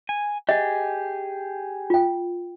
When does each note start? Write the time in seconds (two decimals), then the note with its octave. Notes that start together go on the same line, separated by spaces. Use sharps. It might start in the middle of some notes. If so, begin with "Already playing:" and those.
0.09 G#5
0.49 G4 G#4 D#5
1.90 F4 G5